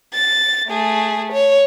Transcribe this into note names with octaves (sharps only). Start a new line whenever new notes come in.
A6
A3 G#4
C#5